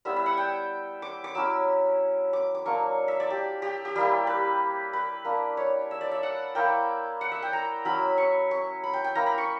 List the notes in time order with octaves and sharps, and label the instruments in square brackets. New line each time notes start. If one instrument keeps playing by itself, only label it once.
[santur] G3 B3 E4 E5
E5
F#5
G5
D6
D6
F#3 C#4 E4 E6
D6
D6
F#3 A#3 D4 C#6
E5
D5
G4
G4
G4
G3 A#3 E4 G4
B4
B4
A#3 D4
C#5
E5
D5
E5
F#5
A#3 E4 G5
F#5
E5
G5
A#5
F#3 C#4 E4 B5
C#6
C#6
B5
G5
G5
A#3 E4 A#5
B5
C#6